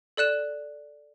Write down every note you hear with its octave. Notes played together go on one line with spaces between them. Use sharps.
A4 D5 F#6 E7